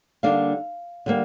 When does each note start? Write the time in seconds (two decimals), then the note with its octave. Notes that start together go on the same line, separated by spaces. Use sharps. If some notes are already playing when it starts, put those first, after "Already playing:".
0.23 D3 G3 A#3 D4 F5
1.06 D3 G3 A#3